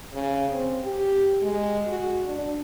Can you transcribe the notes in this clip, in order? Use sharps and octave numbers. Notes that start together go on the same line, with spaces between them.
C#3
C4
G4
G#3
F#4
D4